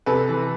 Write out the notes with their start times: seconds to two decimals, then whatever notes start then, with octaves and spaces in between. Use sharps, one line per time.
0.06 C3 A4 B4
0.29 E3